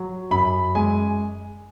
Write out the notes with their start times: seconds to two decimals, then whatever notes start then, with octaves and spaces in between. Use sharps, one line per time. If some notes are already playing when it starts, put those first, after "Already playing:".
Already playing: F#3
0.31 F#2 B5
0.75 G#3 G#5